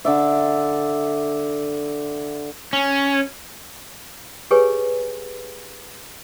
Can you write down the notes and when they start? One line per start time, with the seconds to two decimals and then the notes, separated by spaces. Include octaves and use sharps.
0.05 D3 D5 E5
2.73 C#4
4.51 G4 G#4 B4 C#5 G#5